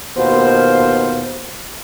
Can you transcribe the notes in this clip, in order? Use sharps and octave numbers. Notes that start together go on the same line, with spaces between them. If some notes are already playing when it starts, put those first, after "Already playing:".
D#2 B2 F4 C5